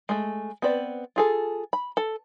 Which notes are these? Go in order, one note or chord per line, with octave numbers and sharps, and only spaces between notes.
G#3 A3
B3 C4 B4 D5
F4 G#4 A4
B5
A4